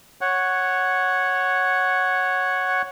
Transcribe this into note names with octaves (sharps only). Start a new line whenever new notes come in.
C#5 F#5